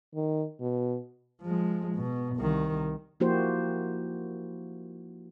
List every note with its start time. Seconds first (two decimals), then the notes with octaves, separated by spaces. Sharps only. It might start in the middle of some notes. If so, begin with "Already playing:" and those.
0.15 D#3
0.60 B2
1.42 F3 G#3
1.96 B2
2.36 C2 D#3
3.20 F3 A#3 E4 F#4 G4 C5